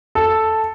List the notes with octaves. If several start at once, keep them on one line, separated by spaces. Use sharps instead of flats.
A4